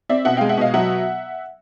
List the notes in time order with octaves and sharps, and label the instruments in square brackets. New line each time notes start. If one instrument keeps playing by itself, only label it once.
[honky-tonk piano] C4 D5 E5
B2 E5 F#5
G#3 F5 G5
E5 F#5
B2 D#5 F5
F#3 E5 F#5